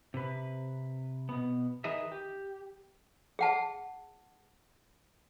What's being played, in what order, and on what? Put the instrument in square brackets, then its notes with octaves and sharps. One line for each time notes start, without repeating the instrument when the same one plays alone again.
[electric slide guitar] C3 B4
B2 B3
D#3 D#4 G#4 B4 D#5 E5
G4
[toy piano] G#4 F#5 A5